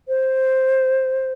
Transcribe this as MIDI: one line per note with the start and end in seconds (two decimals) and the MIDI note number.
0.08 1.33 72